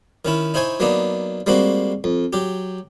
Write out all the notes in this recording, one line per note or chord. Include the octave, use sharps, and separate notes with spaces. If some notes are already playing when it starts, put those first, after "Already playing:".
D#3 C#4 E4
D#4 E4 C5 C#5 G#5
F#3 A#3 B3 D4 D#4
G3 G#3 A#3 C4 F#4
F2
F#3 G4